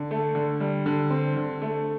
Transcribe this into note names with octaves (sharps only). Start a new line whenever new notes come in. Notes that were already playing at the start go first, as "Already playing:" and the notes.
Already playing: D3
A3
D3
G3
D3
C4
D3
A3